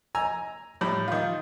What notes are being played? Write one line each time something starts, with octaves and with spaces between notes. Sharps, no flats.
G#5 A#5 E6
A2 G3
D#3 F4